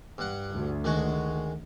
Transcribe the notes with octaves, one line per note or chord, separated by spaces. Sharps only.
G2 F#5
D2
D#3 G#3 F#4